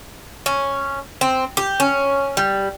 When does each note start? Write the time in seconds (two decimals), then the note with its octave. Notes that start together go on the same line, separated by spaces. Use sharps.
0.46 C#4
1.21 C4
1.57 G4
1.80 C#4
2.37 G3